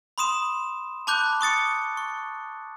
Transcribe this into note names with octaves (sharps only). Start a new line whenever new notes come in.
B5 C6 D#6 E7
A5 B5 D6 F#6 G6
C#6 D#6 A6 C#7
C#6